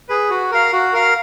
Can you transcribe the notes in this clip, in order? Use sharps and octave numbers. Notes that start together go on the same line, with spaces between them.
G#4 B4
F#4
A#4 F5
F#4
A#4 F5